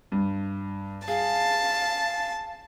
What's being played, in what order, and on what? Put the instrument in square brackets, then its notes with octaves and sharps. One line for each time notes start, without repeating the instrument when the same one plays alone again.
[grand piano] G2
[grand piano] G#4 [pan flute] F5 [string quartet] A5